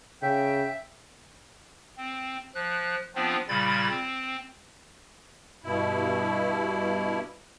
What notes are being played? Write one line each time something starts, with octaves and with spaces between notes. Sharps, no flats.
C#3 E5 G5
C4
F3 F#6
F3 B3 C4 D4 F4
A#2 C#3 G3 B5 G#6 A6
C4
G2 B2 E4